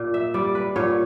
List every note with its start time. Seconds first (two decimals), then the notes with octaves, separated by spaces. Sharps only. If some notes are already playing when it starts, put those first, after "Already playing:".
Already playing: A#2
0.14 E5
0.34 G3 D5
0.55 B4
0.76 A#2 C#5